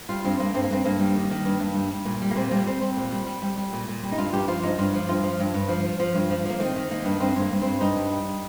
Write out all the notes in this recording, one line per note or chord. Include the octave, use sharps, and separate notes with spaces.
G3 F4
G2 C4
G2 A#3
G2 C4
A#3
G2 C4
G2 A#3
G3
D#3
D#3
G2
G2
G3
G3
A#2
G3
A#3
A#2 C4
G3 A#3
G3 C4
G3 C4
A#2
G3
G3
G3
G3
A#2
A#2
G3
D#4
G2 F4
G2 G4
F3 F4
G2 D#4
G2 F4
F3
G2 F4
F3
G2
G2
F3
F3
F3
G2
F3
F3 A#3
D#3 C4
D#3
D#3 A#3
G2
G2 C4
G2 A#3
G2
G3 C4
G2 D#4
G3
G3